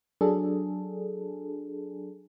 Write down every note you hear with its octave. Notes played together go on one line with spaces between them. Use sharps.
F#3 D4 G#4 A4